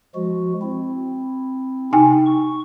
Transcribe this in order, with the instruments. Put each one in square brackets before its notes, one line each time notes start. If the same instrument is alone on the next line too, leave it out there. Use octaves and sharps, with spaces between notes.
[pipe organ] F3 G#3 F#4
C4 E4
[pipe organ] C3 [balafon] D#4 G5 G#5
[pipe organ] C#6